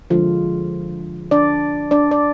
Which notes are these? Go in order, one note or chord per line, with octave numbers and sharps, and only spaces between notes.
D3 F3 G#3 F4
D4 D5
D4 D5
D5